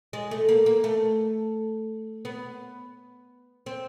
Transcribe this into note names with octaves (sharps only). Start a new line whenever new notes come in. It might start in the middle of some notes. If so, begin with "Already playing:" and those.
G#3
A3
A#3
A#3
A3
B3
C4